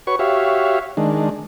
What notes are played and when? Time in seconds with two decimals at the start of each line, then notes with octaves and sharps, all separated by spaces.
0.07 F#4 B4 C#5 C#6
0.19 F#4 G4 C#5 E5 F5
0.97 D#3 G#3 D4